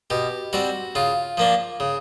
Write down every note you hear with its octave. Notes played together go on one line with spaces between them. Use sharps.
B2 G4
G3 C4 F#4
C#3 F4
F3 A#3 D4
C#3